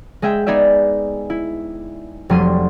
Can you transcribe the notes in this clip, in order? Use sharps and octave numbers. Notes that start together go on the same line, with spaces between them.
G#3 G#4 E5 G5
B3 D#4 G#4 D5 E5
E4
F1 F#3 G3 C6 C7 D#7